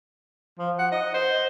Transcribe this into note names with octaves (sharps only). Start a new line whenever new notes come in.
F3
F#5
D#5
C5